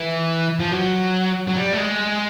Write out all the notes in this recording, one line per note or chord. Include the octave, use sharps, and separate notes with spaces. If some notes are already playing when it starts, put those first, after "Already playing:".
Already playing: E3
F3
F#3
F#3
G3
A3
G#3